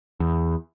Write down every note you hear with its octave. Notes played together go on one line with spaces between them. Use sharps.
E2